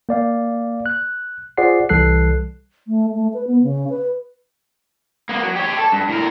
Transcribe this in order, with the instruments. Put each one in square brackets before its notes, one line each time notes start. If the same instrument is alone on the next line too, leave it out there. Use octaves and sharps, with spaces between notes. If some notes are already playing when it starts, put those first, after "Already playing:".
[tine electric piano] A#3 D5 F5
F#6
F4 G#4 C5 D5 F#5 C7
C2 E3 G3 A4 F#6 C7
[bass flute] A3
A3
B4
B3
C#3
B4
[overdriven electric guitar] A#3 B3
F#3
G4 C#5
A4 A5
G2
A2 A#4